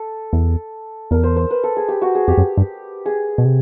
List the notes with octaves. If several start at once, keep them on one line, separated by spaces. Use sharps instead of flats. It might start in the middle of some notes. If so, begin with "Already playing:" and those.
Already playing: A4
E2
E2 A#4
C5
C5
B4
A4
G#4
G4
F#4
G#4
F2 G4
F#2
G2
G#4
B2
C3